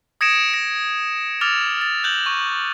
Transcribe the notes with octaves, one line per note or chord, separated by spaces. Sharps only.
D#6 G#6 A#6 C#7 D7 E7
A#6
D6 E6 F6 A6 F7
F6 A6
F#6 G6 F#7
C#6